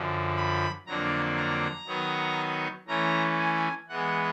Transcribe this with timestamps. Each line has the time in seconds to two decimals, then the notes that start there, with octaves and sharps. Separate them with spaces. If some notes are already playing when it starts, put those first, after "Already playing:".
Already playing: F#2 D3 F3
0.37 B5
0.86 F2 D3 F#3 A#3 D4 A#5
1.36 A#5
1.87 D#3 F#3 B3 D#4
2.88 E3 A3 C#4 E4 A#5
3.39 G#5
3.89 E3 G#3 B3 F#5